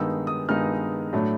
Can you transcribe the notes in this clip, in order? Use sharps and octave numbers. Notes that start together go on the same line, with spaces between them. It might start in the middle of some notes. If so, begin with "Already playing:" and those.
Already playing: G2 D#3 G#3 B3 D#4 E6
D#6
G2 D#3 G#3 B3 D#4 F6
A2 F#3 A3 D4